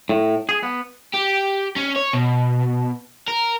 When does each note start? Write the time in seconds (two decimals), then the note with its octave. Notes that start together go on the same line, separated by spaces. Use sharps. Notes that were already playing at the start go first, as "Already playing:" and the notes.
0.09 A2
0.49 G#4
0.63 B3
1.14 G4
1.76 C#4
1.96 C#5
2.13 B2
3.28 A#4